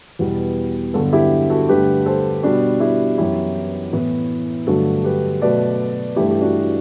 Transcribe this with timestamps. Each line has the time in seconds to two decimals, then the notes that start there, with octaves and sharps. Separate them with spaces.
0.19 E2 B2 G3 B3
0.94 G2 D3 F#3 B3 F#4 A4
1.13 E4 G4
1.50 F#4 A4
1.69 G2 D3 A3 G4 B4
2.06 A4 C5
2.43 B2 G3 B3 D4 F#4
2.80 E4 G4
3.18 F#2 E3 B3 E4 G4
3.93 A2 E3 B3
4.67 G2 D3 F#3 A3 F#4 A4
5.04 G4 B4
5.42 B2 F#3 A3 B4 D5
6.16 G2 E3 A3 E4 G4
6.30 G4
6.41 D4 F#4
6.59 F#4